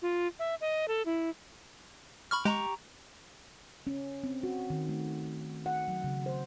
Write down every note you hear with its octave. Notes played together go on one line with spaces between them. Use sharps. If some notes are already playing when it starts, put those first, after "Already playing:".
F4
E5
D#5
A4
E4
B5 C#6 F6
G#3 G4 A#5 C#6
C#4
C4
F#4
D#3
A3
F#5
F#3
C#3
C5